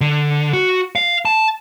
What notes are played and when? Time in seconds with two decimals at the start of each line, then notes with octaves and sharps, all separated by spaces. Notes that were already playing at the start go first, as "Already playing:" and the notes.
0.01 D3
0.53 F#4
0.96 F5
1.25 A5